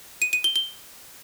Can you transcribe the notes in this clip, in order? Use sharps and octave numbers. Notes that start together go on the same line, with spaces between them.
D#7
D#7
G7
G7